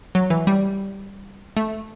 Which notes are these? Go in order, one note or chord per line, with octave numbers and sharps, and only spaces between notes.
F#3
E3
G3
A3